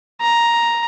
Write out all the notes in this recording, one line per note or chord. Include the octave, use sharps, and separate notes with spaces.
A#5